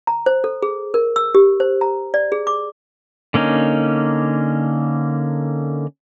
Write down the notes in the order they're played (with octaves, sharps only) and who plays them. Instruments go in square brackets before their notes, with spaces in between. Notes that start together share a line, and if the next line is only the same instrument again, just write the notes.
[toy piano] A#5
C5
A4
G#4
A#4
E6
G4
C5
A#5
D5
G#4
D6
[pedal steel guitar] D3 A#3 C#4 D#4